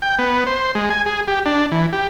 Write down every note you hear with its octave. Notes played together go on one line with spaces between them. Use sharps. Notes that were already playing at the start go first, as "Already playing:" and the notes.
G5
B3
C5
G#3
G#5
G#4
G4
D4
E3
G4